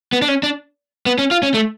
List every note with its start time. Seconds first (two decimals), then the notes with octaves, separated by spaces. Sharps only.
0.13 B3
0.22 D4
0.28 C#4
0.43 D4
1.06 B3
1.18 C#4
1.31 F4
1.43 C#4
1.54 A3